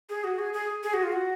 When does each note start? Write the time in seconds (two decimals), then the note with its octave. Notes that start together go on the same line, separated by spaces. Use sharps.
0.10 G#4
0.24 F#4
0.39 G#4
0.53 G#4
0.83 G#4
0.94 F#4
1.03 F4
1.12 F#4